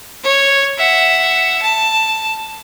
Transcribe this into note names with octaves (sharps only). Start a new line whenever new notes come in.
C#5
E5 F#5
A5